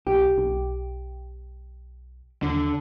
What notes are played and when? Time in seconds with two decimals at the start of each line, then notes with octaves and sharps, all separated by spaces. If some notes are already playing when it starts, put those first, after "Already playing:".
0.07 B1 G4
0.38 B1
2.43 D#2 D3